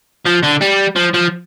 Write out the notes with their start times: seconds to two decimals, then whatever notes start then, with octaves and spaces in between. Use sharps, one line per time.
0.26 F3
0.43 D3
0.62 G3
0.96 F3
1.14 F3